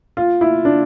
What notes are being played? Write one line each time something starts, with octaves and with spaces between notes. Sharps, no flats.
F4
E4
D4